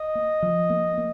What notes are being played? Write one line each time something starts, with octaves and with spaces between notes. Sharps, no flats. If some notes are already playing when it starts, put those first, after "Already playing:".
Already playing: D#5
A#3
F3
A#3
A#3